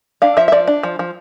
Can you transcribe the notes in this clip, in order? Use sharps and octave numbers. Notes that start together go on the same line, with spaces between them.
D4 F5
F3 E5
E5
F3 D5
D4
F3
F3